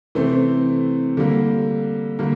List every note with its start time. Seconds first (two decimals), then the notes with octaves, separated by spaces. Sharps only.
0.15 C3 E3 A3 C4
1.17 D3 G3 A#3
2.19 D3 G3 A#3